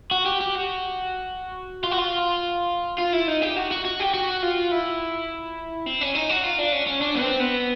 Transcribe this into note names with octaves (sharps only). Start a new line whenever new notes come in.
F#4
G4
G4
F#4
F4
F#4
F4
F4
E4
D#4
G4
F#4
F#4
F#4
G4
F#4
F4
E4
C4
C#4
D#4
F#4
F4
D4
C#4
C#4
D4
B3
C4
B3